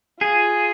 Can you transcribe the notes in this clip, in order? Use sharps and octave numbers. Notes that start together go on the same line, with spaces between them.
F4 G#4